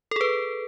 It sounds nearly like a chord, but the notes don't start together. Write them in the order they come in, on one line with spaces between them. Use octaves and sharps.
A4 G#4 B4